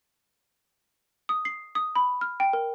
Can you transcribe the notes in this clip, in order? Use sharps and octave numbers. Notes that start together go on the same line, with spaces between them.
D#6
C7
D#6
B5
F6
G5
A#4